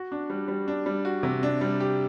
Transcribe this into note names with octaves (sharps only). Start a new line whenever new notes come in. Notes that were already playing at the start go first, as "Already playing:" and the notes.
Already playing: F#4
D4
G3
G3
D4
G3
F#4
C3
D4
G3
G4